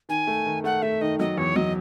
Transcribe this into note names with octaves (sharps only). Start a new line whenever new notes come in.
D#3 G#5
A3
D#3
A3 F#5
A3 E5
D#3 D#5
F#3 D#5
E2 C#5
F#3 D#5